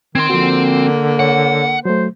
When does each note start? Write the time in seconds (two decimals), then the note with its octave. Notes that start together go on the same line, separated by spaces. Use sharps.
0.15 D#3 C4 C6 G#6
0.29 D3 F3 A#3 F#4
1.19 C#5 F#5
1.85 F#3 A3 C5